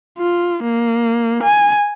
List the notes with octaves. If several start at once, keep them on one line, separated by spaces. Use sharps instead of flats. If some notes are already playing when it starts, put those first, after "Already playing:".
F4
A#3
G#5